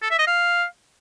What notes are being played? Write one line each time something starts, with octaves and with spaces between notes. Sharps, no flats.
A4
E5
D#5
F5